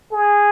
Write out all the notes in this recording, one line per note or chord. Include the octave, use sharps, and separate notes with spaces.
G#4